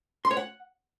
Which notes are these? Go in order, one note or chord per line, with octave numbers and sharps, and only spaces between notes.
C6
C#5
F#5